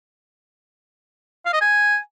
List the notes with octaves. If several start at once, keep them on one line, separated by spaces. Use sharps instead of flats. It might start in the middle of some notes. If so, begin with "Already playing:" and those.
F5
D#5
G#5